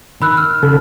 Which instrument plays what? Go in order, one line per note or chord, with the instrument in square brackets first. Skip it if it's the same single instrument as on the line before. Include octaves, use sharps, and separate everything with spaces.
[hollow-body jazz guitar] D#3 [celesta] B5 E6 F#6
[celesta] F6
[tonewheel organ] C#3 A4